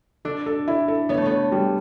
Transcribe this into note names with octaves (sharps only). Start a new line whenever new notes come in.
D4 A4
A4
E4
A4
B3 C#5
A3
B3
C#5
G3